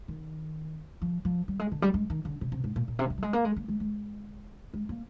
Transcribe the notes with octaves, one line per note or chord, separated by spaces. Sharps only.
D#3
F3
F3
G3
G#3
D3
G3
G#3
D#3
D3
C3
C3
G#2
A#2
A#2
C3
A#3
G3
G#3
A#3
G#3
A#3
G#3
G#3
G#3
A#3